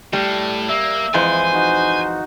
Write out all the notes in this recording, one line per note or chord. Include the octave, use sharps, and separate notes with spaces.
A2 G3
A#3 E5
F2 E3 G#3 C5 G#5
D#4 F#4